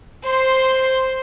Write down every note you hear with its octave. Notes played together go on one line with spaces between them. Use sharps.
C5 C6